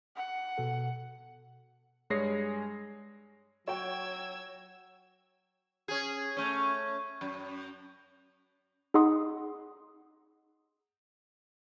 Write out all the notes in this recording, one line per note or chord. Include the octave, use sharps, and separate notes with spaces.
F#5
B2 A4
G2 G#3 G#4 C#5 A#6 C7
F#3 F#4 C#5 G5 E6 G#6
C#4 G#4
A3 C#4
F#2
D#4 G#4 D#5 F#5 C6 D#6